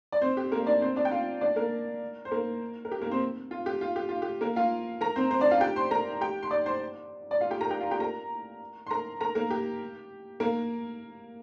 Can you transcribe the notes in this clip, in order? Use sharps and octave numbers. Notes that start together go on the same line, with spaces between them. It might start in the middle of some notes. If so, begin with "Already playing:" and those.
D5
C4 C5
G4
A#3 A#4
D4 D5
C4 C5
D4 D5
G5
F4 F5
D4 D5
A#3 A#4
C5
A#3 A#4
A#4
G4
A#3 A#4
C4 C5
F4
G4
F4
G4
F4
G4
A#3 A#4
F4 F5
A#4 A#5
C4 C5
C4 C5
D4 D5
F4 F5
G4 G5
C5 C6
A#4 A#5
G4 G5
C6
D5 D6
C5 C6
D5
F4 F5
G4 G5
A#4 A#5
G4 G5
F4 F5
G4 G5
A#4 A#5
C6
A#4 A#5
A#4 A#5
A#3 A#4
G4
A#3 A#4